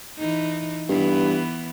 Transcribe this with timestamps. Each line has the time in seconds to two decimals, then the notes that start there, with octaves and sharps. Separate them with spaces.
0.19 E3 D#4
0.89 G2 E3 B3